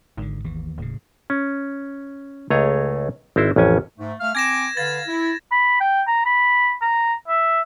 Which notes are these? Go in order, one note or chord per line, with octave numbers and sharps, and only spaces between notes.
G#1 G#2 D3
D#2 E3
D#1 A2 C#3
C#4
C#2 A3 G#4 C#5 D#5 A#5
G#1 C4 E4 C5
A1 F2 C#4 G#5
G#2 A3
A3 F5 F6
C4 G#5 D6 G#6 A#6 E7
D3 B4 F5 A6
E4
B5
G5
A#5
B5
A#5
E5